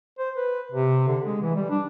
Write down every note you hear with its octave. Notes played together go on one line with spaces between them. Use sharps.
C5
B4
C3
D3
G#3
E3
G3
D4